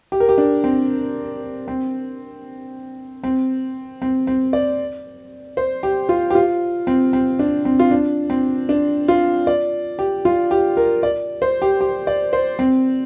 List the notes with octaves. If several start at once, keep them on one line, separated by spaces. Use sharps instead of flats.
G4
A#4
G4
D4
C4
C4
C4
C4
C4
D5
C5
G4
F4
G4
F4
C4
C4
D4
C4
F4
D4
C4
D4
F4
D5
G4
F4
G4
A#4
D5
C5
G4
G4
D5
C5
C4